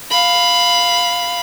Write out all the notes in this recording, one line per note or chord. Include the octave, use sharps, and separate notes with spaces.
F5 B5